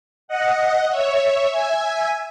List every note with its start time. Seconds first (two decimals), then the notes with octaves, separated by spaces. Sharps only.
0.28 D#5 F#5
0.90 C#5 E5
1.52 E5 G#5